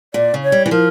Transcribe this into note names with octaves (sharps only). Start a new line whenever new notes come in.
A#2 D5
C#3
C#5
G3
E3
F3 A#4